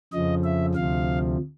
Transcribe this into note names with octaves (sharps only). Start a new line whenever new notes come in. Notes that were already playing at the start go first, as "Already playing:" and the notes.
F2 C#3 F3 D#5
E5
D2 C3 F3 F5